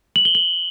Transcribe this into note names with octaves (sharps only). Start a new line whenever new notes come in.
F#7
G7
F#7